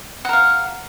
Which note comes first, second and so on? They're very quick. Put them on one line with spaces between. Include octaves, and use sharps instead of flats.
F#5 A#4 F5